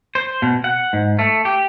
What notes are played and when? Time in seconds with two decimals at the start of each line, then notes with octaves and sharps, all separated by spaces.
0.15 C5
0.42 B2
0.64 F#5
0.93 G#2
1.19 A3
1.45 G4